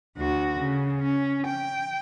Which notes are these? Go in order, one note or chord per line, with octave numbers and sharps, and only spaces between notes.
D2 F#4
C#3
C#4
G5